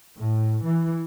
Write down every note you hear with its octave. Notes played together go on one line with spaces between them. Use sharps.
A2
E3